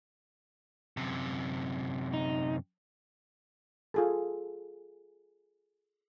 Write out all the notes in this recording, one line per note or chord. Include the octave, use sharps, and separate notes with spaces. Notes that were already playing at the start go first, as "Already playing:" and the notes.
F#2 C3
D#4
F4 G#4 A4